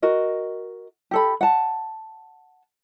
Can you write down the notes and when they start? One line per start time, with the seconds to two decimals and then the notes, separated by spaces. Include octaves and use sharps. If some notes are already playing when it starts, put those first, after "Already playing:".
0.02 F#4 A#4 D#5
1.11 G4 A4 B5
1.41 F#5 A5